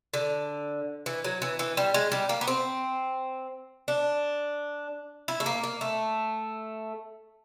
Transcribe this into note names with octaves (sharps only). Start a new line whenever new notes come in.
D3
E3
F#3
E3
E3
G3
G#3
G3
A#3
B3
C4
D4
E4
A3
A#3
A#3
A3